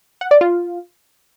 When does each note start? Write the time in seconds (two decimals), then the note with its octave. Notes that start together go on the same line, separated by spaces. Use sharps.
0.21 F#5
0.31 D5
0.41 F4